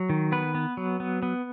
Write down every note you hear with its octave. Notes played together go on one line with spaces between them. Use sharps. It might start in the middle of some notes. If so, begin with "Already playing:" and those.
Already playing: F#3
D#3
B3 B4
B3
F#3
B3
B3